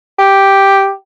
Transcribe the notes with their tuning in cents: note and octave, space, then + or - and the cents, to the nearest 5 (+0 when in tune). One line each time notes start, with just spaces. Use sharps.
G4 +0